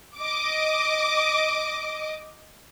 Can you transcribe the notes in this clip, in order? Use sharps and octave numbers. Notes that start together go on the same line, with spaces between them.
D#5 D6